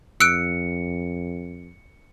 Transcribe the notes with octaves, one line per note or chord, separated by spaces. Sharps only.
F2 E6 F#6 C#7 D7